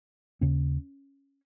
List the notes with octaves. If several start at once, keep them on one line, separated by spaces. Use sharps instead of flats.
D#2 C#3 C#4